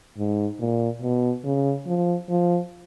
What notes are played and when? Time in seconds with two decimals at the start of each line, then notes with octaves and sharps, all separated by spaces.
0.17 G#2
0.59 A#2
1.02 B2
1.44 C#3
1.87 F3
2.29 F3